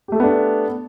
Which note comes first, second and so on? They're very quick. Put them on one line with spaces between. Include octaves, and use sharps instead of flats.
G4 A3 A4 B3 D4